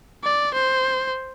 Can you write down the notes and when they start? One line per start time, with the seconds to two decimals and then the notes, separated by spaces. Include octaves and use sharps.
0.24 D5
0.54 C5